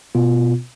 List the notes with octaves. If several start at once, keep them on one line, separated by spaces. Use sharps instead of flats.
B2 B3 F4